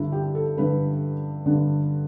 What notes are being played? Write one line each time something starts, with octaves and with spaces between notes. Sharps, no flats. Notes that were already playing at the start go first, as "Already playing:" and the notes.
Already playing: G2 D3 E4
G4
A4
G2 D3 B4
G2 D3